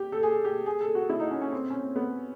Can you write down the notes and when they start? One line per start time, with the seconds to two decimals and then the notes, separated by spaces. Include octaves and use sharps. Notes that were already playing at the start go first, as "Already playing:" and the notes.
Already playing: G4
0.12 A4
0.23 G#4
0.45 G4
0.66 G#4
0.81 A4
0.95 F#4
1.10 E4
1.20 D#4
1.31 C#4
1.42 C#4
1.52 C4
1.70 C#4
1.83 C4
1.96 B3